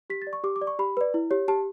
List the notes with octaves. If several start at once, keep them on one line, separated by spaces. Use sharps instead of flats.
G4 B6
A6
D5
C#6
G4 D6
D6
D5
C#6
G4 B5
B4 D5
E4
G4 C#5
G4 A5